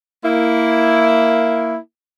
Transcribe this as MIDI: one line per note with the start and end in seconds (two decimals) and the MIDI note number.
0.24 1.77 58
0.24 1.77 64